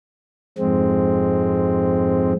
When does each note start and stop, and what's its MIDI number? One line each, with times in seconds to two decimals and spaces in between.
0.58 2.33 41
0.58 2.33 44
0.58 2.33 56
0.58 2.33 60